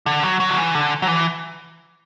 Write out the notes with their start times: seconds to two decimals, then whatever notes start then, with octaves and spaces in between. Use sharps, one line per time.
0.06 D3
0.23 F#3
0.40 F#3
0.49 D3
0.57 E3
0.75 D3
1.02 F#3
1.08 E3